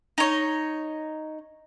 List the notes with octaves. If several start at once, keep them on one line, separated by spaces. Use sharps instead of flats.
D#4 C#5